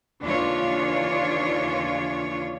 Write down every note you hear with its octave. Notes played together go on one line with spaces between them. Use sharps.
D#2 C#3 E3 D4 F4 C#5